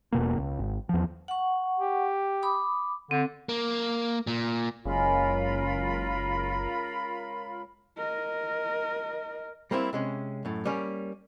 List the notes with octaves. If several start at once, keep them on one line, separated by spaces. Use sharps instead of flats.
E1 B2 A#3
C#2
G#1
E2 F3
F#5 C#6
G4
B5 D6 D#6
D3 C4
A#3
A#2
F#1 C#3 G#3 F4 A#4 B5
A#4 D#5
G3 A#3 C4 E4
C3 G#3 C#4
F#2 A2
G3 A#3 C#4